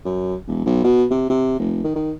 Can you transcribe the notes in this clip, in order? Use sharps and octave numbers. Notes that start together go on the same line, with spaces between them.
F#2
E1
B1
B2
C3
C3
F1
D#3
D#3